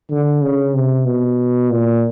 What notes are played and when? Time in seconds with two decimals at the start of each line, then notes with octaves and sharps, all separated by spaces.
0.11 D3
0.42 C#3
0.75 C3
1.05 B2
1.70 A#2